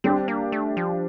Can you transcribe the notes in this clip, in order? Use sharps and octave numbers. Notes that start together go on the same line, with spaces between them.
G3 C4 D4 G4
A#3
A3
F3